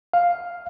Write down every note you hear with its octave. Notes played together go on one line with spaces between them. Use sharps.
F5